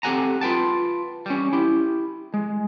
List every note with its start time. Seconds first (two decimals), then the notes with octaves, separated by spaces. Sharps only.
0.03 C4 G4 A4 F#5 G#5 A#5
0.41 F4 B4 G5 A5
1.26 G3 C#4
1.53 E4 G4
2.34 G#3